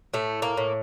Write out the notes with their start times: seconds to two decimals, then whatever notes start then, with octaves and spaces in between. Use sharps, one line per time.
0.14 A2 A3
0.42 A#3
0.57 A2